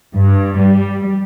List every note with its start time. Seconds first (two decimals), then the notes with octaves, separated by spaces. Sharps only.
0.14 G2
0.56 G3